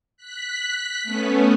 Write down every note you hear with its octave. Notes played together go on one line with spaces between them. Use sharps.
F#6 B6
A3 B3 C#4